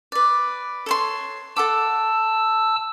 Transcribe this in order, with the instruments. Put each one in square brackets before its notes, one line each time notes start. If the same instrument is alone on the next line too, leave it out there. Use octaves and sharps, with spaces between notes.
[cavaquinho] B4 D5
A4 C#5 C6
[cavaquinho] A4 F#5 D6 [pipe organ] A5 E6